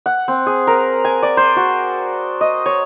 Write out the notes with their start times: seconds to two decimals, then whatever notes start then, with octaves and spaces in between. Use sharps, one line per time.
0.06 F#5
0.28 C4
0.46 G#4
0.67 A#4
1.05 G#5
1.23 D5
1.37 C5
1.56 F#4
2.41 D#5
2.66 C#5